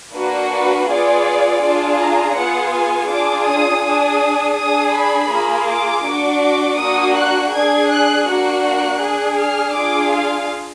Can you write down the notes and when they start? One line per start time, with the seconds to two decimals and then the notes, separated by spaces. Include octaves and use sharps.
0.14 A#3 D4 F#4 B4
0.51 B4
0.88 B3 F4 G#4 D5
1.62 D4 F4 G#4
1.99 A#5
2.36 B3 F4 G#4 F#5
2.73 G#5
3.10 D4 F4 G#4 D6
3.46 D#6
3.83 D4 G#4 D#6
4.57 D4 G#4 D#6
4.94 B5
5.31 A#3 F4 G#4
5.69 D6
6.05 D4 F#4
6.42 D6
6.78 A#3 D4 F#4 D#6
7.16 F#6
7.52 D4 G#4 G#6
7.89 F#6
8.27 A#3 D4 F#4 F#6
9.01 D4 G#4
9.37 F6
9.74 D4 F4 G#4 D6
10.12 F5